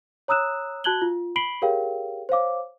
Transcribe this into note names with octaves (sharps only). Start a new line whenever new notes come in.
C#5 A#5 D#6 E6 F#6 E7
F#4 A5 F#6 G#6 F#7 G7
F4
B5 B6 C7 D7 F#7 G7
G4 G#4 A#4 C#5 F5 G5
C5 C#5 F5 D6